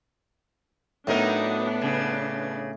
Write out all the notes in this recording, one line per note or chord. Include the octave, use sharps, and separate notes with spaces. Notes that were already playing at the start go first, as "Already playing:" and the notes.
A2 F#3 B3 D4 D#4 A#4
C#3